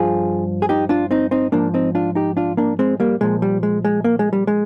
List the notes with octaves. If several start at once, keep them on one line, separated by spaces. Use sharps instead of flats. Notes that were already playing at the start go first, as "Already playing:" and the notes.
Already playing: G2 F3 F4 G#4
G#4
D#4 G4
D4 F4
C4 D#4
C4 D#4
G#2 F3 A#3 D4
C4 D#4
D4 F4
D#4 G4
D4 F4
A#3 D4
G#3 C4
G3 A#3
A#2 F3 G#3
G3
G#3
G#3
A#3
G#3
G3
G#3